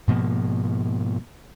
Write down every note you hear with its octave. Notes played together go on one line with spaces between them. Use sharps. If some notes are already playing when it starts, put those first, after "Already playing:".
G#2 B2 F3 A#3